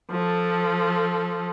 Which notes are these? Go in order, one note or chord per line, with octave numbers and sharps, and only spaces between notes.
F3 A4